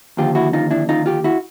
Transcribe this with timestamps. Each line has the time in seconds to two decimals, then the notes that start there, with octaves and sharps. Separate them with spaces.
0.17 D#2 D3 F3 F4 G4
0.35 E4 F#4
0.53 D#4 F4
0.71 D4 E4
0.89 D#4 F4
1.06 F4 G4
1.24 E4 F#4